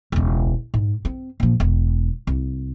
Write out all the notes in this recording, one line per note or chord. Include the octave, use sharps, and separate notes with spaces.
E1 C#2
G#2
C4
A#1 F3
E1
C2